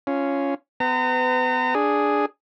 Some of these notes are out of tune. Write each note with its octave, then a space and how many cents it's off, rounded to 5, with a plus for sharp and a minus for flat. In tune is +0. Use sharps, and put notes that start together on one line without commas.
C#4 +5 F4 -15
B3 +35 B4 +40 A#5 -35
D4 +0 G#4 +0